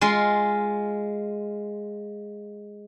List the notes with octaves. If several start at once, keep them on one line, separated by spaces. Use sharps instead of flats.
G#3 F4 C6